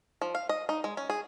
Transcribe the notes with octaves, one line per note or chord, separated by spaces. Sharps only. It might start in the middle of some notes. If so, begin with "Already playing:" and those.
F3
F5
D#5
D#4
G#3
C#4
G#4